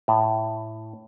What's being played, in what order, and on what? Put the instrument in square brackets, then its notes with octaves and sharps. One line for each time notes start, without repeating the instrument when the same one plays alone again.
[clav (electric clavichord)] A2